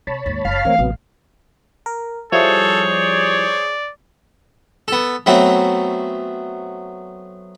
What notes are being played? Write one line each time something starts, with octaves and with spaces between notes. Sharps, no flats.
C3 C#5 A5 B5
D#2 G#2
F#1 F5
E3 A3 C4 A#4 C#5
A1 C3 F#3 B3
A#4
F3 G3 E4 G#4 A4 C5 C#5
D5
B3 A4
F#3 A3 B3 C4